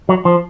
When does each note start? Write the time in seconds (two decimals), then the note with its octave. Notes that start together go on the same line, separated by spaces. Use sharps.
0.09 F#3
0.25 F3